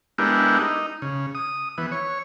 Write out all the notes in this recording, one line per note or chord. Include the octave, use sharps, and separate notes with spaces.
G#3 B3 D4 E4 G4 A#4
D#4
C#3
D#6
E3 B3
C#5